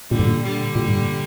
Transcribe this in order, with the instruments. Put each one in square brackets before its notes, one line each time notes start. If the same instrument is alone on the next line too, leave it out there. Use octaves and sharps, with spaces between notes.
[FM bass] A#2 [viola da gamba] D3 G3
[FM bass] G2
A#2
[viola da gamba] D3 G3
[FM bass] A#2
G2
A#2